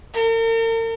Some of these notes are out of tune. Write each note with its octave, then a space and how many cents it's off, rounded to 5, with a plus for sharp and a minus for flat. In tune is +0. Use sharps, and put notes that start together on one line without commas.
A#4 -45